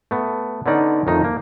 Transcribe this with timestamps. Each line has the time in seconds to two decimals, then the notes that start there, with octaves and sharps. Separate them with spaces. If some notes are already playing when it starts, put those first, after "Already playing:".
0.11 A3 B3
0.66 D3 B3 C#4 D#4 D5
1.07 F2 D#3 A3 D#4
1.24 A#3